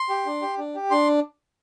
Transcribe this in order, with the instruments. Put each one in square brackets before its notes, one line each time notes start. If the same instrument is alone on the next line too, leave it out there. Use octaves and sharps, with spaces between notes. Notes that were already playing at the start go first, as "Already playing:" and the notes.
Already playing: [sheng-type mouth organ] C6
G4
D4
G4
D4
G4
D4 C6